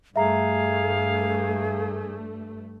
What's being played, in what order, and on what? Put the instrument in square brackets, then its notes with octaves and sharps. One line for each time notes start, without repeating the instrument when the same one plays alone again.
[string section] G2 A3 [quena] G#4 [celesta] E5 A#5 [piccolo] F5